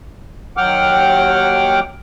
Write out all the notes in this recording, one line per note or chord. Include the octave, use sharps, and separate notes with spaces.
D#2 F#3 F#5 G5 D6 F6